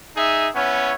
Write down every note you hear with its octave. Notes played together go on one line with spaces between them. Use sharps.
D#4 G#4 E5
B3 C#4 E4 C#5